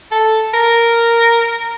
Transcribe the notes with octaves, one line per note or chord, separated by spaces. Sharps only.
A4
A#4